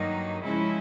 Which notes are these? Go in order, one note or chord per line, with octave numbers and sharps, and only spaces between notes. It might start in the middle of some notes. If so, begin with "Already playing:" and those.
Already playing: G2 D#3 F#3 A#3 D#4
C#3 F3 G#3 C#4 E4